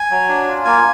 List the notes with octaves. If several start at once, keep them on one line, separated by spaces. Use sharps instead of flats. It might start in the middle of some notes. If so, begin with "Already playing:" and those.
Already playing: G#5
F#3
D4
F4
A#3 G#5